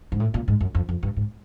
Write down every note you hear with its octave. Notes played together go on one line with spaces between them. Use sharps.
G#2
A2
A#2
G#2
F#2
F2
F2
G2
G#2